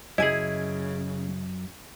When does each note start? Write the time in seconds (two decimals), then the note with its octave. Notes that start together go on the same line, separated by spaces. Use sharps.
0.18 F#2 C#3 E4 G#4 D#5 G#5